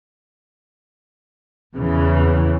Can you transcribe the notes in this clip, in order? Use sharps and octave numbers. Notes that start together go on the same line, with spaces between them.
E2 C#3 E3